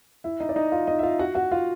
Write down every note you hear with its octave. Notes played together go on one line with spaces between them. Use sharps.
E4 E5
D#4 D#5
D5
D#4 D#5
F4 F5
D#4 D#5
E5
F4 F5
F#4 F#5
F#4 F#5
F4 F5